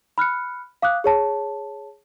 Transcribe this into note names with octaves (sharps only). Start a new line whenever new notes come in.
B5 F6 F#6 C#7
F5 D6 D#6 F#6
G#4 C#5 A5